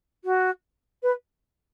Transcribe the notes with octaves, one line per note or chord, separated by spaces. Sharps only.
F#4
B4